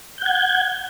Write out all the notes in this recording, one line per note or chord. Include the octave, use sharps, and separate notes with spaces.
F#5 G6 G#6